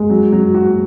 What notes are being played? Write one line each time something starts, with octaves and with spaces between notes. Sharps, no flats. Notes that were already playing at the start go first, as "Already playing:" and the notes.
Already playing: G#3
F#3
F#3
F#4